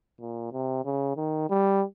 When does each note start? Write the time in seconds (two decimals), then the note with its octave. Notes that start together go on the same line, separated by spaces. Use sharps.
0.21 A#2
0.52 C3
0.85 C#3
1.17 D#3
1.50 G3